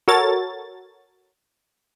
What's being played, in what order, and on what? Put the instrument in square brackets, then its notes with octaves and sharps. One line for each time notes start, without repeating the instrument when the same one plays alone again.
[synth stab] F#4 A4 A#4 C#5 A6